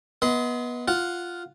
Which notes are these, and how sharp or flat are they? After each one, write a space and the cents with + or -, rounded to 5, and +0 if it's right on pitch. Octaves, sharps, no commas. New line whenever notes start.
B3 -20 D#5 +30 C6 -20
F4 +0 F#5 +0